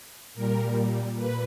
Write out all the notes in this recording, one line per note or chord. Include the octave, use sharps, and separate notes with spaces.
A#2 G3 A#4
A#2 B4